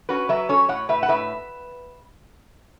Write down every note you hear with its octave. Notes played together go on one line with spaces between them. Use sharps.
C#4 F#4 B4
F#3 B4 E5
C#4 A4 C#5
A2 C#5 F#5
A2 B4 E5
F#5
A2 B4 E5